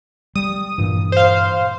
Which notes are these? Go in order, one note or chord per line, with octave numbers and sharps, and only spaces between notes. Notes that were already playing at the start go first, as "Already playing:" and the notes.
G3 D#6
G2 A#2 E3
C5 F5